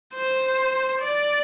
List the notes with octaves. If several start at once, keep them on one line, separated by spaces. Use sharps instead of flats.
C5
D5